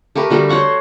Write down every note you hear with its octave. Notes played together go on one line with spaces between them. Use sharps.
A3 G4 A#4 B4
D3 G3 F#4 A4
C5 C#5 F#5 C#6